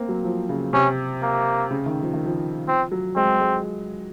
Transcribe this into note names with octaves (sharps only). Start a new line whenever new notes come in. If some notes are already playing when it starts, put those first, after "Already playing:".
Already playing: A#3 C4
F#3
F3
C#3
C3 C#4
A#3
C#3
D#3
F3
D#3
F3
F3 C4
F#3
G#3 C4
G#3